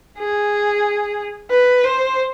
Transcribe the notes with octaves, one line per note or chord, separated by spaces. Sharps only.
G#4
B4
C5